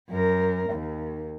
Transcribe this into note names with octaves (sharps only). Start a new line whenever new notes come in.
F#2 A#4
D#2